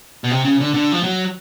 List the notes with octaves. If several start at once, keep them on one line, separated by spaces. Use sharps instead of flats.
B2
C3
C#3
D3
D3
F3
F#3